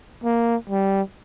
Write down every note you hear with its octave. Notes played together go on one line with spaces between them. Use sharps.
A#3
G3